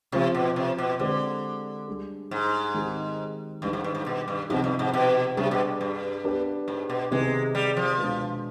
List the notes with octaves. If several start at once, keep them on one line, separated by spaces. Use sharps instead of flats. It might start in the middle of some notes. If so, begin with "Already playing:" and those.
C3 F3 C4 F4
B2
C3
B2
D3 G#3 C4 G4 C5
G3 D4 G#4
G#2
D#3 G#3 C4 D#4 G4
G2 D#3 G3 D4
G#2
G2
G#2
B2
G2
G#2 C3 F3 C4 D#4 G4
G2
G#2
B2
C3 G3 D4 G#4
B2
G2
B3 D4 G4 B4
G#2
B2
C3 D#3 G#3 B3 D#4
G3
F3
B2 G#3 D4